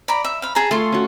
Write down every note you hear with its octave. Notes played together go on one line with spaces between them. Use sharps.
D5 A#5 B5
E5
F5 B5
G#4 A5 A#5
A3 F4 C6
C#4 F#4